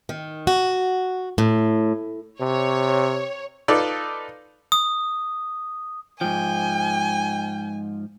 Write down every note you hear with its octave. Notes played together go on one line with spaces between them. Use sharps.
D#3
F#4
A2
C3 C#5
D#4 F4 A4 B4 D5
D#6
G#2 F3 G5 G#5